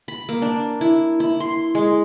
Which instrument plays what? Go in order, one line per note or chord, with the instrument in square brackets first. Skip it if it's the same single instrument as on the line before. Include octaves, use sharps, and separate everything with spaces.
[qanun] B5
A#3
D4
E4
E4
C6
G#3